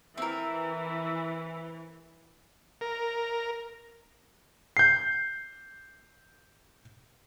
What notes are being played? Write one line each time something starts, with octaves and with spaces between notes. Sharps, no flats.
E3 C4 A#4 E5
A#4
G6 C7